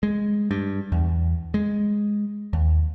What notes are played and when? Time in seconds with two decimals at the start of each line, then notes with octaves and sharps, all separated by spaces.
0.03 G#3
0.51 G2
0.92 E2
1.54 G#3
2.53 D#2